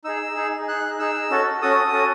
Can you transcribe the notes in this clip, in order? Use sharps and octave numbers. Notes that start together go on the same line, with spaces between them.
D#4 G#4 E6
D#4 G#4
D#4 G#4 F#6
D#4 G#4 E6
C#4 F#4 A4
C#4 F#4 A4 D#6
C#4 F#4 A4